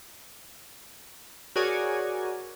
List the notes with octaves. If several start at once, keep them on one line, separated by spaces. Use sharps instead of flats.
F#4 G#4 A#4 C#5 D5 G#5